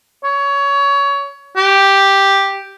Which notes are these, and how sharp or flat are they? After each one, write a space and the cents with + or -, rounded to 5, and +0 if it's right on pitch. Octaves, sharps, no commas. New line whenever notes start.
C#5 +20
G4 +0